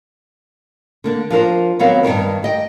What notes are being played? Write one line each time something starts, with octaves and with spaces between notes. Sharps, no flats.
D3 A#3 D4
F3 D4 A#4 C5
D#3 F#3 B3 C4 A#4 F5
G2 B2 D#3 A#4
G4 D#5 G5